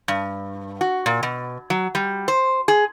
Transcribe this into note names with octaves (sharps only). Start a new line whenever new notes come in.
G2
F#4
A#2
B2
F#3
G3
C5
G#4